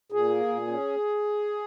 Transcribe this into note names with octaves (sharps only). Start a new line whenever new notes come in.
A#2 G#4
A#3
A#2
C#4